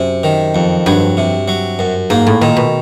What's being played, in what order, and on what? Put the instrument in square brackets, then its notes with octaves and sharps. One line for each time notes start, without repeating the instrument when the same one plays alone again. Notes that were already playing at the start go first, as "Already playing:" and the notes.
Already playing: [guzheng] F#2 [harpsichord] C3
[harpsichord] D#3
F2
[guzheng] G2 [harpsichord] F#3
[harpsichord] C3
F#3
F#2
[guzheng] G#2 [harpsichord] A#3
[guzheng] A2
[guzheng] A#2 [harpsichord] D#3
[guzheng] B2